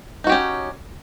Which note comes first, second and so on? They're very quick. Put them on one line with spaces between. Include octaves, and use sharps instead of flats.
D#4 F#4 G4 C#4